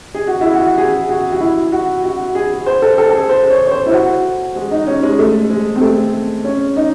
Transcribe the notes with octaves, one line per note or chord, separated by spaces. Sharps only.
G#4
F#4
E4
F#4
G#4
F#4
F#4
E4
F#4
F#4
G#4
C5
A4
A4
A4
G#4
C5
C#5
C#5
C5
E4
F#4
G#3
D#4
C#4
G#3
A3
G#3
C4
A3
C#4
D#4